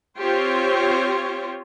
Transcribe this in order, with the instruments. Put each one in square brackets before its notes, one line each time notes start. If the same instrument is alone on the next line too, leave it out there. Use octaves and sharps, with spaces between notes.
[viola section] C4 F4 G4 C5 C#5